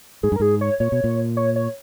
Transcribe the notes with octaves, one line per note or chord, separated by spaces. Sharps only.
G#2 G#4
G2
A#4
G#2 G#4
C#5
A#2 C#5
B2
A#2
C#5
C#5